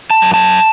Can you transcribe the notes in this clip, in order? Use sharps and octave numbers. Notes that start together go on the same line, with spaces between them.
A5
F#2
A5